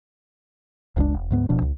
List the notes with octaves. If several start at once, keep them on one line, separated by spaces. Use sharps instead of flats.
F#1 C#2 G#3 D4
E1
D2 G#2 B3
D1 B2 F3 D4
C#2